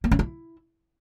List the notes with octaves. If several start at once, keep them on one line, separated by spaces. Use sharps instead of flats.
A#3
C#4
E4